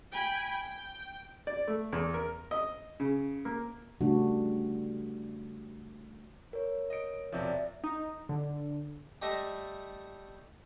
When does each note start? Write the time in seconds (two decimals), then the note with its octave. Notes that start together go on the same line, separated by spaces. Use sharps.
0.13 G5 G#5 B5
0.63 G5
1.47 D5
1.68 A3
1.93 E2
2.14 A#4
2.51 D#5
3.00 C#3
3.45 A#3
4.01 C#3 G3 A3 D4 F#4
6.53 A#4 C#5
6.90 D#5 D7
7.32 E1 C3 F3 D5 E5
7.84 D#4
8.29 D3
9.22 G3 A3 D#5 E5